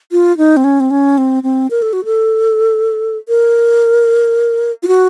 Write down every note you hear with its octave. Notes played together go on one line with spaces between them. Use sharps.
F4
D#4
C4
C#4
C4
C#4
C4
C4
A#4
A4
F#4
A4
A#4
F4
F#4